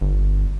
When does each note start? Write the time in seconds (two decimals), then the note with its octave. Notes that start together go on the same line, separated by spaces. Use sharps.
0.01 G1